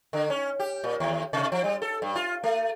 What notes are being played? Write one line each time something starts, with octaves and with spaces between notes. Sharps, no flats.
D3
C#4
G4
A#2
D#2
C3
F3
G3
A4
G2
F4
A3